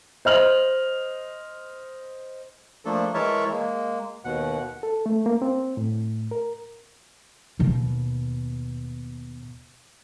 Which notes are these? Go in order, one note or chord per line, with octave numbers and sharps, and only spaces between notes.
C5 D#5 F6 F#7
F3 A3 A#3 D4 A4
E3 G#3 A#4 C#5 E5 A5
G#3 A#3
D#2 B2 F#5
A4
A3
A#3
C4
A2
A#4
D#2 B2